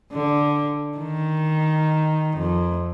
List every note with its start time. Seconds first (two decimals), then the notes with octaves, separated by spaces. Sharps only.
0.12 D3
0.98 D#3
2.37 F2